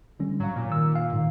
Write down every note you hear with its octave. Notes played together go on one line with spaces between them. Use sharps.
D3 G3 C#4
G#2 F#3 F5
A#2
D#3 E6
F5
G#2 D#3